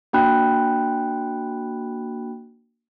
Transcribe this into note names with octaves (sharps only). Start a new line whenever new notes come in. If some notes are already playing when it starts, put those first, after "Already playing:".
A#3 D4 F#4 G5 B5 F#6